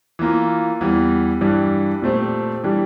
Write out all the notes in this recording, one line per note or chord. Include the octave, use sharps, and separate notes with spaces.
E3 A#3 F4
E2 E3 G3
G2 E3 G3 D4
A#2 A3 C4 G4
E3 G3 D4 G4